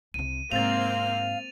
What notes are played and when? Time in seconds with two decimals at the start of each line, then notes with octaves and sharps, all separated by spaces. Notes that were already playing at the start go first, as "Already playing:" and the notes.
0.14 C2 C3 D#7
0.52 G#2 C3 A#3 C4 F5 A6 F7